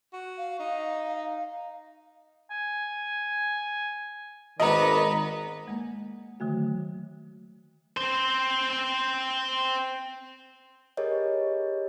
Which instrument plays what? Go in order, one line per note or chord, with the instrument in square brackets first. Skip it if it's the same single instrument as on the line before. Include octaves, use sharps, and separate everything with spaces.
[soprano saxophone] F#4
[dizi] F5
[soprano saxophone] D#4
[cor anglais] G#5
[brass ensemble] G#1 D#3 [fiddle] B3 B4 [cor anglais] D5 [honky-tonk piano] D#5 A#5
[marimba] G#3 A#3
D3 D#3 F#3 A3 F#4
[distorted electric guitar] C4 C5
[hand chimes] G4 G#4 A#4 B4 C#5 D#5